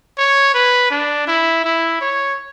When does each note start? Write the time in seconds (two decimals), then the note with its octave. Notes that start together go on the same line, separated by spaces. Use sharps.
0.17 C#5
0.54 B4
0.91 D4
1.27 E4
1.64 E4
2.01 C#5